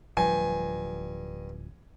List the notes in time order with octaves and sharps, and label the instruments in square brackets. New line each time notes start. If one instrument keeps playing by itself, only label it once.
[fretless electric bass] D1 F3 G3 [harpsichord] G2 [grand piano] G#5